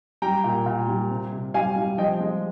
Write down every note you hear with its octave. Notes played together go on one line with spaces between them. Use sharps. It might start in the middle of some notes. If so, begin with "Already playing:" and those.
G3 G5 A#5
A#2
A#2
G3
C3
C3
G3 F5 G#5
G3
F3 D#5 G5
G#3